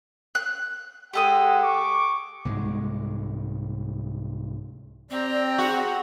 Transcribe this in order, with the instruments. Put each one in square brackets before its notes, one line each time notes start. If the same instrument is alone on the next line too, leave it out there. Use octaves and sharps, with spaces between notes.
[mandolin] F#6
[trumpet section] G#3 D#5 F#5 [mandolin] G4 A4 D#6
[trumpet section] C#6 D6
[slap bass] C2 G#2 G#3
[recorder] C4 [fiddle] G4 A#5 [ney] D5
[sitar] F#4 [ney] G#4